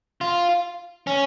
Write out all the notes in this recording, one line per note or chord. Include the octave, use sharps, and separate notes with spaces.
F4
C#4